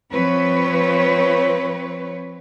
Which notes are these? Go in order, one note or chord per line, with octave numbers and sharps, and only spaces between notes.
F3 C4 B4 C#5